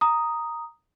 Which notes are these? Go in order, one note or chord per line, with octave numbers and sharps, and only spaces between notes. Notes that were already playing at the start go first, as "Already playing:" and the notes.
A#5 D#6